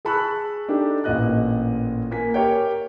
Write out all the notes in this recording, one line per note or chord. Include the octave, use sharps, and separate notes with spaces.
G#4 A5 B5 C#6 E6 F#6
D4 D#4 G4 A4
A1 A#2 D#5 F#6
A#3 G#5 B6
G4 A#4 C#5 G5